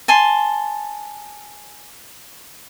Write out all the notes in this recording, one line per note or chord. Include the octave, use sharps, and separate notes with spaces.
G#5 A5 C6